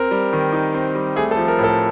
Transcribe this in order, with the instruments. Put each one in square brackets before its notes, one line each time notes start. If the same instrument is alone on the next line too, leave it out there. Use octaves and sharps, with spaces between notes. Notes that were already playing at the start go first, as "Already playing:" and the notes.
Already playing: [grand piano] C4 A#4
G3
D#3
D#4
C4
G3
A3 G#4
A4
F3
A#4
A2
A4